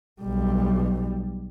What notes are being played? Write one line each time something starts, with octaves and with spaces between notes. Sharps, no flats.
B1 G3